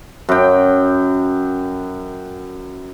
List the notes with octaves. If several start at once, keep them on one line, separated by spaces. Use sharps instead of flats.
F#2 G5